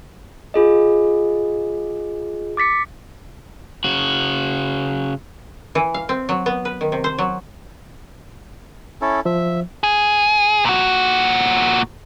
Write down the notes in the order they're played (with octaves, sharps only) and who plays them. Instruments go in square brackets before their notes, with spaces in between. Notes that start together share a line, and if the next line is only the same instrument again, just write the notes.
[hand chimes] F4 G#4 D#5
D6 A6 B6 C#7
[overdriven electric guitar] C#3 F#4
[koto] E3
F5
C4
F#3
B3
B4
D#3
C3
C5
F#3
[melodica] C#4 E4 A4
[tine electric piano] F3 [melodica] E5
[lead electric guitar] G#4
A#2 F#4